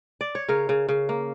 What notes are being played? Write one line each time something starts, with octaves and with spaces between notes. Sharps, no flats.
D5
C#5
C#3 A#4
C#3
C#3
A#3